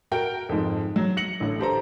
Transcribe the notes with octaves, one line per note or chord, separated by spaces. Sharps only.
F#4 A#4 G5
F2 G#2
F#3
A#6 C#7 F#7
A1 D3
G4 A4 C5 A#5